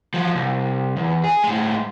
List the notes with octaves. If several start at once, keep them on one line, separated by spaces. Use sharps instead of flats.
F3 F#3
C2
E2
G#4
A2 G#3